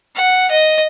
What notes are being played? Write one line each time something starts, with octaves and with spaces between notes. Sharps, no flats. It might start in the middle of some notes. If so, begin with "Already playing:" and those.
F#5
D#5